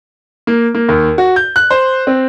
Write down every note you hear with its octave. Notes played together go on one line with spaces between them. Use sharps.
A#3
A#3
D#2
F#4
G6
F#6
C5
C4